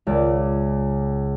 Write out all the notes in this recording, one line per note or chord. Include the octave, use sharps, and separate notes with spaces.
C#2 D5